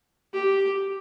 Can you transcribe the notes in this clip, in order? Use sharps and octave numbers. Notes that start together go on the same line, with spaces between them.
G4